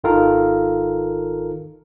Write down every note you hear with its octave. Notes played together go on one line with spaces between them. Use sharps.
G#1 D#3 F4 A4 A#4 F5